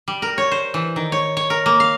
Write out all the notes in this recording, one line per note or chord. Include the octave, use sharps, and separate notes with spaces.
G3
A#4
C#5
C5
E3
D#3
C#5
C#5
A#4
A#3
F5